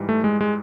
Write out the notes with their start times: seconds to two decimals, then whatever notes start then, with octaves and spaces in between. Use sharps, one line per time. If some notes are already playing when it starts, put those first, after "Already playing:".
Already playing: G#2 E3 G3
0.09 A3
0.24 G#3
0.41 G#3